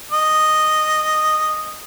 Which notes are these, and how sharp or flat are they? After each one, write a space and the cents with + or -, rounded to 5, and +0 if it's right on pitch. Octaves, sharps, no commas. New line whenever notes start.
D#5 -5